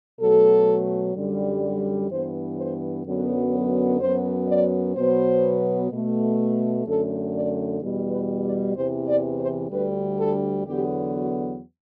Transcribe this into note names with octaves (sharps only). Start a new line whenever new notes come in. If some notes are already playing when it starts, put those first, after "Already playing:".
B2 F#3 A3 A4
F#2 D3 G3
G2 E3 B3 C5
C5
F#2 D3 F#3 B3
B4
F#2 F#3 B3 C5
D5
B2 F#3 B3 C5
B2 A3
F#2 D3 A3 A4
D5
E2 B2 G3
B4
D5
E2 C3 E3 C5
D5
C5
D2 D3 G3 B4
A4
E2 D3 F#3 B3 G4
F#4